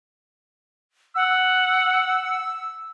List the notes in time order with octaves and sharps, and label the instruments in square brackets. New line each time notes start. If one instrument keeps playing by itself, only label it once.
[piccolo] F#5 [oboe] E6